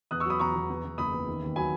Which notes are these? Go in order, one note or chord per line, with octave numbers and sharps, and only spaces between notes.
E2 D#6 F#6
C#6 E6
F#3 B5 D#6
E2 A#5 C#6
E2
E2
E2
F#1 B5 D#6
E2
D#3
D#2
F#3 G#5 B5